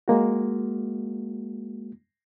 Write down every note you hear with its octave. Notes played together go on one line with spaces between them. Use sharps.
G#3 A#3 F#4